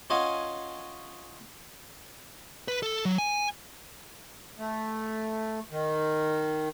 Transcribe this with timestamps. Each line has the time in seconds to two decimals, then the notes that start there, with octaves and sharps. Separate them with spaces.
0.10 C#4 F4 D#5 F#5 G#5 A5
2.68 B4
2.83 A4
3.05 F#3
3.18 G#5
4.59 A3
5.71 D#3